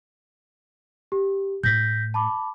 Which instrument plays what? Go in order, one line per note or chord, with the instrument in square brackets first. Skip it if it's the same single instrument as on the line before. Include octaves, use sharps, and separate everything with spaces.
[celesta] G4
[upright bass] A2 A3 [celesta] G6 A#6 B6
[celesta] A5 B5 D6